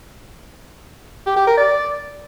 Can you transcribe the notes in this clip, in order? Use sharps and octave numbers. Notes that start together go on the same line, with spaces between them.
G4
G4
A#4
D5